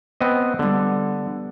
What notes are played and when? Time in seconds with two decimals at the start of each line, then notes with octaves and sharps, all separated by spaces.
0.21 B3 C4 D#5
0.59 D3 G3 B3